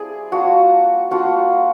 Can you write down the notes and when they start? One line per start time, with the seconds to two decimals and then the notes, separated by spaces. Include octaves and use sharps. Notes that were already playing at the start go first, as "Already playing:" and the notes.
Already playing: G3 C4 E4 G#4 D5
0.31 G3 A#3 D4 F4 F#4
1.11 G3 A#3 D4 F4 F#4